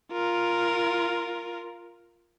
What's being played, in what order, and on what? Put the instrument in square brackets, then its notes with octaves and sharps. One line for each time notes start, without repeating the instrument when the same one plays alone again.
[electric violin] F4 A#4